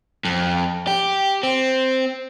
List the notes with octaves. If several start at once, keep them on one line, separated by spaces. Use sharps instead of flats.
F2
G4
C4